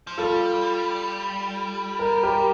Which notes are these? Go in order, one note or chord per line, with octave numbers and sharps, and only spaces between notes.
F3
G3 F4 A4
A#4
G4 A#4